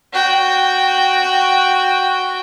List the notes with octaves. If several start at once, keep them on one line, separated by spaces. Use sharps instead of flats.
F#4 G5